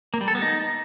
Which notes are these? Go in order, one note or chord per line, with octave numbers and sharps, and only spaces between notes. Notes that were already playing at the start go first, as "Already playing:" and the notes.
A#3
G3
A4
B3
D#4